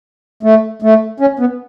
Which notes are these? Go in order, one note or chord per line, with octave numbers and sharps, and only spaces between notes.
A3
A3
C#4
B3